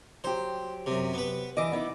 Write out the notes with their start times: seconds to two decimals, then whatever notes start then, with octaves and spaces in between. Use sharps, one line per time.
0.24 F#3 G4 C5
0.86 F#2 C3
1.14 B3 B4
1.57 E3 D#5 D6
1.72 B3 D#4 E4